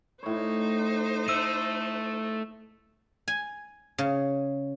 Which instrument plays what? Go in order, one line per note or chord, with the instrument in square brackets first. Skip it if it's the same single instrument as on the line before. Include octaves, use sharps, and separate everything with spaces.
[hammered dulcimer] A2 C#5 [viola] D#4 C5
[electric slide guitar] A3 [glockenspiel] E6 D#7
[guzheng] G#5
C#3